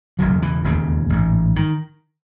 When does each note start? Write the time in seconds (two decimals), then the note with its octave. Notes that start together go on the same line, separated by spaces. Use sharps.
0.19 E1 D#2 C#3 F#3
0.42 E3
0.64 E1 D#2 C#3
1.09 A1 G#2
1.56 D#3